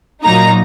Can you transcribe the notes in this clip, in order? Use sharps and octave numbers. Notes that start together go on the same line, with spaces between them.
A#2 F#3 A#3 D#4 A#5